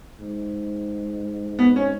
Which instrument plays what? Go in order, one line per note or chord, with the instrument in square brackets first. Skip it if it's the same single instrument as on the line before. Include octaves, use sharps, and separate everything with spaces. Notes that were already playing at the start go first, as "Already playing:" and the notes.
[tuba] G#2
[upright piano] B3
C#4